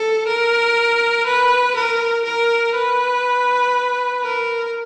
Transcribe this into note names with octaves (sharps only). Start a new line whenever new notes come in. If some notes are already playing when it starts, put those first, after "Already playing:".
Already playing: A4
A#4
B4
A#4
A#4
B4
A#4